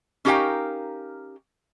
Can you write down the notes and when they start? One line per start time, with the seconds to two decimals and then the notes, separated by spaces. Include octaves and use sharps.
0.25 C#4 D#4 G4 A#4 F5 G5